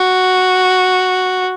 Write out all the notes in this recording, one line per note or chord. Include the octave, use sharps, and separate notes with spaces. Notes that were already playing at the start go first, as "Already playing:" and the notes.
Already playing: F#4